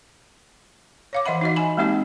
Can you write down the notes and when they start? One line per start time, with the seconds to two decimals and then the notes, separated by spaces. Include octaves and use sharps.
1.13 C#5 F5 D6
1.26 E3 D#5 E5 F#5 B5
1.41 D#4 F#4 D#5
1.56 G#5 B5
1.77 G#3 A#3 C4 D#4 G4 D#5